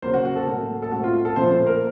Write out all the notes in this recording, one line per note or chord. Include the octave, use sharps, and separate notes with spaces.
C#3 F#3 A#3 C5
F#4
F#4
A4
A2 F#3 A#3
A4
A2 A3 C4 F#4
F4
A4
A#2 F3 A3 C5
C5
A#4